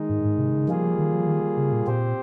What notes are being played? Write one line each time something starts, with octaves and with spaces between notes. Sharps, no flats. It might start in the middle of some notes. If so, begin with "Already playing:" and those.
Already playing: D#3 G#3 D#4
G#2
G#2
C3
C#3
F3 G3 A#3 F4 G#4
D#3
F3
D#3
C#3
A#2
A#2 C4 G4 C5